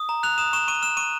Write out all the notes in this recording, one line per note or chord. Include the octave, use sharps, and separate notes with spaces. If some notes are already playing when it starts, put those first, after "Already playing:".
Already playing: D#6
A#5
F#6 F7
D#6 E7
C#6 E7
C#6 D#7
F6 E7
C#6 D#7